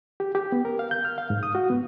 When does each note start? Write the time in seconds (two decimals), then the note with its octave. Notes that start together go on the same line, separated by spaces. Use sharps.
0.20 G4
0.35 G4
0.52 B3
0.65 A#4
0.79 F5
0.91 G6
1.05 F6
1.18 F5
1.30 G#2
1.43 D#6
1.55 F#4
1.70 B3